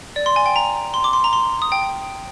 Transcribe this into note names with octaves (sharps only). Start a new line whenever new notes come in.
D5
C6
G#5
G5
A#5
C6
D6
C6
A#5
C6
D#6
G5